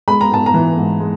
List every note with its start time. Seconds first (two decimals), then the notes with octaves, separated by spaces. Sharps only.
0.08 G#3 B5
0.21 A#5
0.31 G#2 A5
0.46 A#5
0.54 E3
0.77 G#2
1.00 G#3